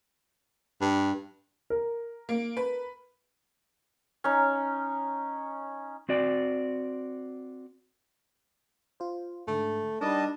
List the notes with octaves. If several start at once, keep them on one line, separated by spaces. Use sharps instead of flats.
G2
A#4
A#3
B4
C#4 D#4
C4 F#4 D5
F4 C5
G#2 D3 A3
G3 D4 D#4 A#4 D#5 A5